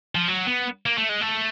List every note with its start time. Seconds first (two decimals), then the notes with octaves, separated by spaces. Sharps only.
0.15 F3
0.28 F#3
0.47 B3
0.86 A#3
0.98 A3
1.09 G#3
1.21 A3